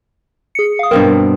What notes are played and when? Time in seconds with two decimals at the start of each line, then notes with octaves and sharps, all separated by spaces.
0.55 G#4 C#7
0.79 F5 D#6
0.91 G2 B2 C4 A#4